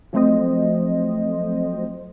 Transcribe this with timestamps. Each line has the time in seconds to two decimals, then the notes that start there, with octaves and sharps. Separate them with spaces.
0.13 F3 F#3 A3 C4 C5 D#5